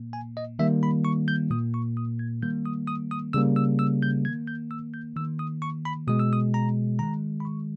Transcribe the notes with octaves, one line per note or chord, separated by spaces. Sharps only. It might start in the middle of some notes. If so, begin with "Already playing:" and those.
Already playing: A#2 A#3
G#5
D#5
D#3 G3 A#3 E5
B5
C#6
G6
A#2 A#3 D#6
C#6
D#6
G#6
D#3 G3 A#3 G6
D#6
D#6
D#6
C#3 G3 A#3 E6
E6
E6
G6
D#3 A#3 G#6
G6
E6
G6
D#3 A#3 E6
D#6
C#6
B5
B2 G#3 D#6
E6
D#6
A#5
D#3 G#3 A#5
B5
C#6